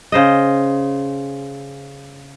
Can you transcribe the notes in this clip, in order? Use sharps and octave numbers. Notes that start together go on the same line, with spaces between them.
C#3 C5 D#5